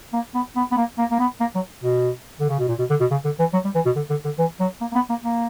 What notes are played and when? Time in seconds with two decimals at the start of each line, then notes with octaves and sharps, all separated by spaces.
0.13 A#3
0.35 B3
0.56 B3
0.71 B3
0.77 A#3
0.98 A#3
1.11 A#3
1.20 B3
1.40 A#3
1.55 F#3
1.83 B2
2.40 D3
2.49 C#3
2.59 B2
2.69 A#2
2.79 B2
2.90 D3
3.00 B2
3.11 C#3
3.25 D3
3.39 E3
3.53 F#3
3.65 G3
3.75 E3
3.85 B2
3.96 D3
4.10 D3
4.25 D3
4.38 E3
4.60 F#3
4.81 A#3
4.92 A#3
4.95 B3
5.10 A#3
5.24 A#3